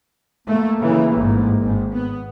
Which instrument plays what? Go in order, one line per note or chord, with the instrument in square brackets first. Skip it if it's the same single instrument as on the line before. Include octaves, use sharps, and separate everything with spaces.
[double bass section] A3 [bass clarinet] A#3
[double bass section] C#3 E3
A1 G#2
G#1 G#2
B3